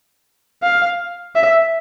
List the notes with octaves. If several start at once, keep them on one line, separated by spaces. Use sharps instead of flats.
F5
E5